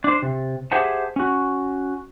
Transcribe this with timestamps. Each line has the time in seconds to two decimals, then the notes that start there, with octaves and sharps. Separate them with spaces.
0.04 D4 C5
0.22 C3
0.72 G4 G#4 C5 E5 F#5 A5
1.16 C#4 F#4